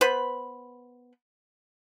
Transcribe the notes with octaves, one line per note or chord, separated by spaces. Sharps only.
B3 B4 C5 B5